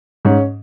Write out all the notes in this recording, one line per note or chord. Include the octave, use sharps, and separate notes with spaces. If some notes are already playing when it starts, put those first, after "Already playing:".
G#2 C#4